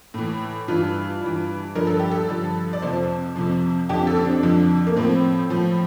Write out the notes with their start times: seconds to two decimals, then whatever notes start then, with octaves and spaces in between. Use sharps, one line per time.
0.14 A2 E3
0.68 G2 E3 F4
1.21 G2 E3
1.75 G2 D3 F3 A#4
1.87 A4
2.00 G4
2.11 A4
2.28 G2 D3 F3
2.73 D5
2.82 F2 C3 F3 C5
3.36 F2 C3 F3
3.89 F2 D3 F3 G4
4.07 A4
4.17 C4
4.25 D4
4.43 F2 D3 F3
4.87 A#3
4.96 A2 F3 C4
5.50 A2 F3